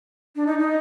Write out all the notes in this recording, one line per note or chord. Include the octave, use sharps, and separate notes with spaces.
D4
D#4
D#4